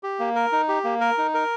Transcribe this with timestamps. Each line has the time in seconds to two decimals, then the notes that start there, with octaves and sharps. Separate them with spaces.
0.03 G4
0.19 A#3
0.35 A#4
0.52 D#4
0.68 G4
0.84 A#3
1.01 A#4
1.18 D#4
1.34 A#4